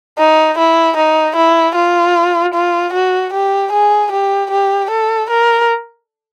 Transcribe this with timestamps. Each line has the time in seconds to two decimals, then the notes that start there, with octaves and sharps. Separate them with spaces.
0.19 D#4
0.58 E4
0.97 D#4
1.36 E4
1.75 F4
2.54 F4
2.93 F#4
3.33 G4
3.72 G#4
4.12 G4
4.51 G4
4.90 A4
5.30 A#4